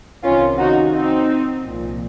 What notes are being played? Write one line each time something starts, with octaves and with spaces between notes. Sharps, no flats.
C2 C3 D#3 C#4 F4
D#4 F#4
C4 D#4
C2 A#2 F3